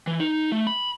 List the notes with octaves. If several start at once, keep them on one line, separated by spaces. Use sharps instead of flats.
E3
D#4
A3
B5